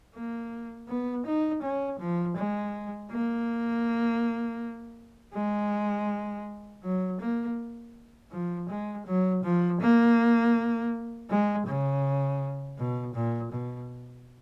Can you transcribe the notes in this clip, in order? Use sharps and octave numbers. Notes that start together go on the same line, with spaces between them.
A#3
B3
D#4
C#4
F3
G#3
A#3
G#3
F#3
A#3
F3
G#3
F#3
F3
A#3
G#3
C#3
B2
A#2
B2